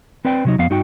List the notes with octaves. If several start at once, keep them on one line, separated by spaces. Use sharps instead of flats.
C4 B4 D5 G5
C3 F#3 D#4
F2 B3 F5
G2 D#4 F#4 G5